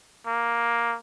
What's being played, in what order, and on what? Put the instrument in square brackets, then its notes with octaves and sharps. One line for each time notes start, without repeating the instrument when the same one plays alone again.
[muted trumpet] A#3